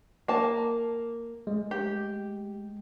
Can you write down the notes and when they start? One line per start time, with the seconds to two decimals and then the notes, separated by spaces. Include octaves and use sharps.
0.28 A#3 A5
1.47 G#3
1.71 G4